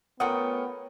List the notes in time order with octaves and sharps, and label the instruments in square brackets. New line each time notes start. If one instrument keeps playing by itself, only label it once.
[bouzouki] A3 C#4 [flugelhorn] B3 [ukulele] F4 F#5 [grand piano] A#4 G5 D#6